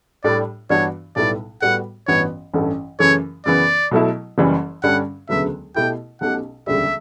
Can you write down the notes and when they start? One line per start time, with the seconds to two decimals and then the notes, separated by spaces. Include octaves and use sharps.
0.24 A2 G3 D4 G4 D5
0.70 G2 E3 B3 D4 F#4 C#5
1.16 B1 A2 G3 B3 E4 D5
1.62 A2 G3 B3 F#4 F#5
2.08 A1 G2 E3 B3 F#4 C#5
2.54 A1 G2 E3 A3 C#4
2.99 F#2 C#3 E3 A3 C#5
3.45 F#2 C#3 E3 B3 D5
3.91 B2 F#3 A3 E4
4.38 F#1 F#2 E3 G3 C#4
4.83 G2 D3 G3 C#4 F#5
5.29 E1 D2 C#3 F#3 B3 E5
5.75 B2 A3 E4 G4 G5
6.21 B1 B2 A3 C#4 G4 F#5
6.67 E1 D2 C#3 G3 E5